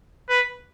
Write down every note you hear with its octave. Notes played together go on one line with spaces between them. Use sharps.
B4